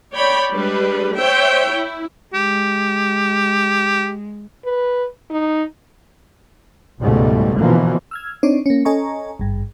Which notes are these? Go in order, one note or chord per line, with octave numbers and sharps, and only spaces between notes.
C#5 D5 G5 B5
G3 G#3 D4 B4
C5 C#5 E5 G5
E4
G#3 G4
B4
D#4
C#2 G#2 B2 G3 A3
B2 D3 E3 F3 A#3
E6 F6 G#6
C4 D4 D#4 C#5 D5
A#3 C#4
C#4 A4 D#5 G#5 A#5 C#6
G#1 G2